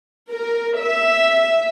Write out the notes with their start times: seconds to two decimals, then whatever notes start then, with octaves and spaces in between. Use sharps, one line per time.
0.33 A#4
0.79 E5